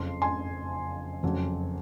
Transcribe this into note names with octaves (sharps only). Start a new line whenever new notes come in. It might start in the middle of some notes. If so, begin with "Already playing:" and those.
Already playing: F#1 F2 C#3 F3 C6
G#5 C6
F#1 F2 C#3 F#3